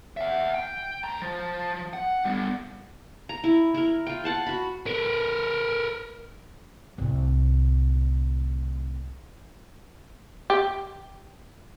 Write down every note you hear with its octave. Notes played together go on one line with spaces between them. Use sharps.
E5 F#5
G5
D2 A#5
F3
F#5
G3 B3
A#5
E4
E4 A#4
F4 G5
F#5 A5 C6
F#4 B5
A#4 B4
C2 A2
G4